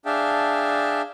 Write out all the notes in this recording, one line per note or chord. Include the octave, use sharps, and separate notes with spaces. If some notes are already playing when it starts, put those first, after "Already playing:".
D4 G#4 E5 F5 G5 A5